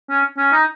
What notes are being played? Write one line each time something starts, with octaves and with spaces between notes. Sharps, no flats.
C#4
C#4
D#4